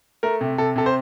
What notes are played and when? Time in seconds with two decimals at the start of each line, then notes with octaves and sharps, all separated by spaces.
0.23 A3 A#4
0.41 C3
0.58 C3 A4
0.76 C3 A4
0.86 C5